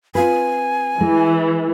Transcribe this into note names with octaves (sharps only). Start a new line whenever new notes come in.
C4 F4 B4 G#5
E3 G#3